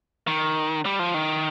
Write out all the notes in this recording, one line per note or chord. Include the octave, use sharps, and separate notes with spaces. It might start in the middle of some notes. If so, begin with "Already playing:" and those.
D#3
G3
F3
D#3